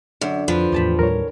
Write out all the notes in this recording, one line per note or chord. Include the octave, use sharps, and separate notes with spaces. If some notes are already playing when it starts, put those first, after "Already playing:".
F#2 D3
F2 F3 B4
E2 A2 G4 A5 B5
D#2 A2 G3 A#4 C#5